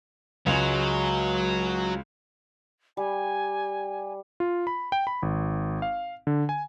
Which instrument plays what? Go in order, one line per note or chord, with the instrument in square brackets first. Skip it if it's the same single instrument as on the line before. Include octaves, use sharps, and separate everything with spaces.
[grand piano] C#2 G#3 [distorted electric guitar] F#3
[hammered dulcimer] G3 [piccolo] G#5
[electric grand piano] F4
B5
G5
B5
G#1
F5
D3
G#5